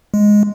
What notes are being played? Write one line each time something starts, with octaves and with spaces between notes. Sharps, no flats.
G#3